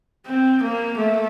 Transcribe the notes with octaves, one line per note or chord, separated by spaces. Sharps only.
C4
A#3
A3